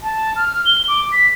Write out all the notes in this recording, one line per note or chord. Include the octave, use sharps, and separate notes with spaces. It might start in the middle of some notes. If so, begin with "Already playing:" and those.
A5
F6
G7
D6
B6